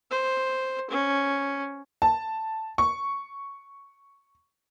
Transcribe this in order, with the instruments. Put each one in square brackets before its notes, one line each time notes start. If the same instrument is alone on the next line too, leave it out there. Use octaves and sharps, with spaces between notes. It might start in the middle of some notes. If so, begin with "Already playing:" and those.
[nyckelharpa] C5
C#4
[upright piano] A5
C#6